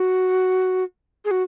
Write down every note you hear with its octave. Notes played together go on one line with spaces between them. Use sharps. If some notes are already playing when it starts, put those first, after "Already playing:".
Already playing: F#4
G#4
F#4